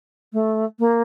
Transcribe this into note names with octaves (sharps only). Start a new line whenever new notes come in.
A3
A#3